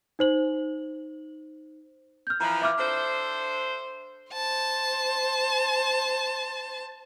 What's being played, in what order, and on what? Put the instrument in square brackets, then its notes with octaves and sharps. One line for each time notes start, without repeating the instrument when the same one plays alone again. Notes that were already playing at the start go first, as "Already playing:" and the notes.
[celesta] D#4 C5 F#7
F6 G6
[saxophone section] E3 F3 [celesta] A#5
[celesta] E5 D6 F6
[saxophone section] D4 A4 C5
[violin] C5 A5